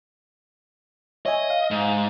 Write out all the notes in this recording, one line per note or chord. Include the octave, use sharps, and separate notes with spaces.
C#5 D#5 E5 G#5
F5
G#2